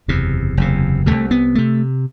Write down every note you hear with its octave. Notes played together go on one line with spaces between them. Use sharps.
F#1 E2 C3
F#1 E2 C3
C2 C3 A3
B3
C3 A3